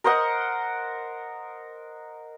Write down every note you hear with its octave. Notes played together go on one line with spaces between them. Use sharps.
A#4 C5 D#5 F#5